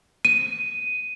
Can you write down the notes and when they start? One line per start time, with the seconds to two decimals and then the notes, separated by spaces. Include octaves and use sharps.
0.25 D#7